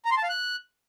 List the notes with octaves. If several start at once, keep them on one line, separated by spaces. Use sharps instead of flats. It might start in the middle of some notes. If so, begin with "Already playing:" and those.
A#5
C6
A5
F5
F#6